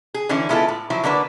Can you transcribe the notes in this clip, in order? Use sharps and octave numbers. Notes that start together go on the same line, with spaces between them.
G#4
D3 E3 C#4 E4
G#3 B3 E4 F4 A4
A2
F3 F#3 E4
D3 A#3 D4 B4